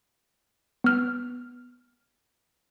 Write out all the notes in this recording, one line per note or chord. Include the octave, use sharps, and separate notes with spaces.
B3 F6